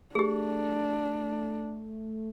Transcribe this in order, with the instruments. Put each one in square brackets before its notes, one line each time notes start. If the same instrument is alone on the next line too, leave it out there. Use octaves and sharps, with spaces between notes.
[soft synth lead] A3 [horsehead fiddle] D4 [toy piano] G4 G#4